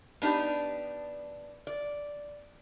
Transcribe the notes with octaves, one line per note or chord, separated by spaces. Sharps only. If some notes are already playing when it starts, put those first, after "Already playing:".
B3 D4 D#4 G4
D5